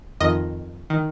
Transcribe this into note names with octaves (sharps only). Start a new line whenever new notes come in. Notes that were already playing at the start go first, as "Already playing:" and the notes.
F2 D#3 D#5
D#3